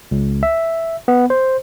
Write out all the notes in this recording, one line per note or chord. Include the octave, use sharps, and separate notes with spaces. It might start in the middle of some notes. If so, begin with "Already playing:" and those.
C#2
E5
B3
C5